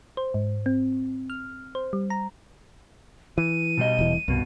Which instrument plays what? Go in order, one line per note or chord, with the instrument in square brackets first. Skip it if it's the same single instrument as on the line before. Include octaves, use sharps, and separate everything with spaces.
[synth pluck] C5
G#2
C4
F6
C5
G3
A#5
[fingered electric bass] E3 [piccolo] D#7
[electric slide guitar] B2 G3 D#5
[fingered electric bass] E1 E3
[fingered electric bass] C2 [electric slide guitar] G2 B2